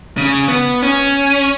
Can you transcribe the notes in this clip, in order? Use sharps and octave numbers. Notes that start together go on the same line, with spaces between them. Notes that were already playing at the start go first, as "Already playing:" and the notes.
C#3
B3
C#4